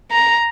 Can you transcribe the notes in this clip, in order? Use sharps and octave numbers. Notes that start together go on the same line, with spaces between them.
A#5